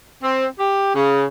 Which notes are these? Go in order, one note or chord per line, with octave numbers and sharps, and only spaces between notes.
C4
G4
C#3